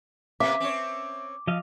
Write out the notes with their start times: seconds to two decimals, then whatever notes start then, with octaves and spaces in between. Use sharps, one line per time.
0.40 C3 A#3 B4 E5 D6
0.60 C4 C#4 C#5
1.47 F3 D#5 F5